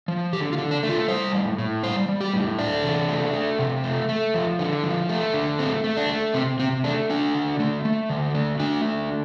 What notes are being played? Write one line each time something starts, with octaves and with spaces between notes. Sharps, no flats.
F3
D3 G4
F4
D3
D4
A3
F4
G3 C5
A2
A2
G3 C5
G3
G4
A2
A3 D4
C3
A3
A3
C3
A3
A3
F3
D3
F3
A3
D3
A3 C4
A3
D4
A3
C3 C4
C3 C4
A3 D4
A3 D4
D3
A3
A3
D3
A3
A3 D4
D3